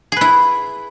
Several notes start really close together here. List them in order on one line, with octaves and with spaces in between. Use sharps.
G#4 B4 E4